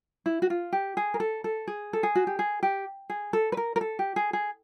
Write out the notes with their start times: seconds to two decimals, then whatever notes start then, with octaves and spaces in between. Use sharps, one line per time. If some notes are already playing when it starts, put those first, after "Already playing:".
0.26 E4
0.42 F#4
0.50 F4
0.73 G4
0.97 G#4
1.14 A#4
1.20 A4
1.44 A4
1.68 G#4
1.93 A4
2.03 G#4
2.15 F#4
2.27 G4
2.39 G#4
2.63 G4
3.10 G#4
3.33 A4
3.52 B4
3.57 A#4
3.76 A#4
3.81 A4
3.99 G4
4.16 G#4
4.33 G#4